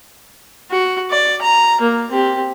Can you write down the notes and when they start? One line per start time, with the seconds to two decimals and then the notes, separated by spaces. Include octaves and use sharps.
0.71 F#4
1.10 D5
1.42 A#5
1.81 A#3
2.10 C4 G4